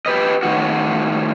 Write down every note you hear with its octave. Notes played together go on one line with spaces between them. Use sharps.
G4 B4 D#5
A2 D#3 F#4